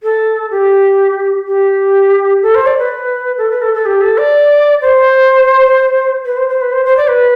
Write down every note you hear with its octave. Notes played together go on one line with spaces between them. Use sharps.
A4
G4
G4
A4
C5
D5
B4
A4
B4
A4
A4
G4
A4
D5
C5
B4
C5
C5
B4
C5
C5
D5
B4